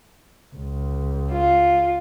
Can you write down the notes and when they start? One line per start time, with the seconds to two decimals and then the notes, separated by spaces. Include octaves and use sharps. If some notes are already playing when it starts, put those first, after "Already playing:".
0.56 C#2
1.31 F4